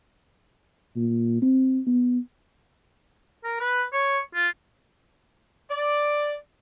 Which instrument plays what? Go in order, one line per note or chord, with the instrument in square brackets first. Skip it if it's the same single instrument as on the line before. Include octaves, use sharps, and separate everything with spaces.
[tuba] A#2
C4
B3
[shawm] A#4
B4
C#5
F4
[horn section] D5